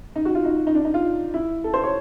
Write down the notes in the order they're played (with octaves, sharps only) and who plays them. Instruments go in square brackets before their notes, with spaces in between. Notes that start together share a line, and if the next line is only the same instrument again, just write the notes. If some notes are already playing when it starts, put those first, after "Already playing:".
[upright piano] D#4
F#4
F4
D#4
D#4
D4
D#4
F4
E4
A4
C5
C#5